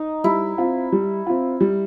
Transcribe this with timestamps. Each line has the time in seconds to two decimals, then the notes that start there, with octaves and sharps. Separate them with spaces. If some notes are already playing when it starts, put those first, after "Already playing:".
Already playing: D#4
0.24 G3 E4
0.58 C4 F4
0.92 G3
1.27 C4 F4
1.61 G3